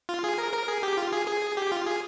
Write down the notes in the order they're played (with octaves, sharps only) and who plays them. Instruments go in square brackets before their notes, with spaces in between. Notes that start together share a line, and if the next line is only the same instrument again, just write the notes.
[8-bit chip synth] F4
G#4
A#4
A#4
G#4
G4
F4
G#4
G#4
G4
F4
G#4